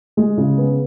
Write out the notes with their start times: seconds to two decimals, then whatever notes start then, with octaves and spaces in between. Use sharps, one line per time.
0.17 G#3
0.37 C#3
0.58 B3